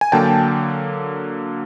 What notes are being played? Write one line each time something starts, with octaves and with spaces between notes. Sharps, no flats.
G#5
D3 F#3 A#3 G5 A5